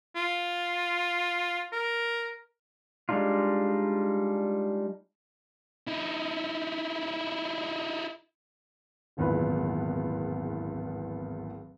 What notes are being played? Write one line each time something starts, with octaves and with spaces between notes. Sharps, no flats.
F4
A#4
G3 G#3 D4 D#4 F4
D#4 E4
D1 G#1 E2 A#2 B4